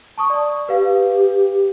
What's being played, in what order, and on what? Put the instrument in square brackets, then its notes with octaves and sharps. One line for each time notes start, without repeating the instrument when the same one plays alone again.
[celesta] A5 C#6 D#6
D5
[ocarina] G4 [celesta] B4 F5